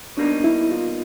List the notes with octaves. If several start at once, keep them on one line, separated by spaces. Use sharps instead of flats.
B2 G3 A#3 D4 D#4
E4
F4